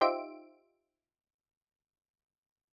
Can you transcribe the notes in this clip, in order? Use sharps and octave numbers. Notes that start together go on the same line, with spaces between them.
D#4 F4 G4 C5 E5 D7